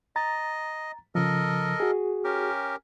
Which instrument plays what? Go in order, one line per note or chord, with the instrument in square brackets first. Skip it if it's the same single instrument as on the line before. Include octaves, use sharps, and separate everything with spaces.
[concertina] D#5 [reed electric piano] A#5 A6
[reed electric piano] C#3 F3 [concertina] A4 A#4 D#5
[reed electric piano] F#4 G#4
[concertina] C#4 G4 A#4